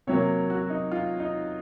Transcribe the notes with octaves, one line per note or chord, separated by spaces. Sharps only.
C3 F#3 A#3 C#5
F#4
D#4
F4
D#4